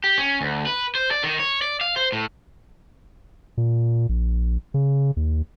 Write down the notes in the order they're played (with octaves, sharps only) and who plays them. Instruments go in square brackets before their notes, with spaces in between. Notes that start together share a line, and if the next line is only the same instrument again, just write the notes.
[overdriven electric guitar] G4
C#4
D2
B4
C5
D5
D#3
C#5
D5
F5
C5
A2
[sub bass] A#2
A#1
C#3
D#2